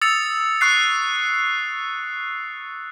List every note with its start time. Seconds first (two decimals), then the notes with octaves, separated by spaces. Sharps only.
0.01 D#6 E6 A6 C#7 F7
0.61 C#6 F#6 C7